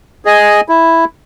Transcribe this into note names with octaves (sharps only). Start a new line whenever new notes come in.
G#4 D#5 G#5
E4